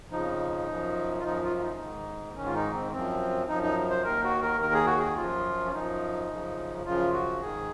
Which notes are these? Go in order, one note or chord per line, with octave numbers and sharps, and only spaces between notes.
F2 C#3 F3 D#4
F#2 F3
F4
F#2 F3 D#4
F4
F4
D#4
G#2 D#3
G#2 D#3 C#4
F4
D#4
C4
F#2 F3 C4
F#2 F3 D#4
D#4
C5
D#2 D#3 A#4
F#4
A#4
D#2 D#3 A#4
G#4
F#4
G#4
F#2 F3 F4
C#4
F#2 F3 D#4
F#2 C#3 F3
F#2 C#3 F3 F4
F#4
G#2 D#3 G#4